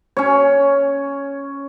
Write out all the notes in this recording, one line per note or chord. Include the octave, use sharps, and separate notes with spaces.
C#4 C#5